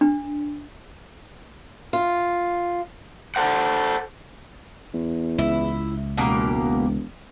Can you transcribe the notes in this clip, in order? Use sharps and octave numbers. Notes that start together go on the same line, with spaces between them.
D4
F4
A4 C5 F#5
E2
C#2 E4
E1 B2 A#3 G4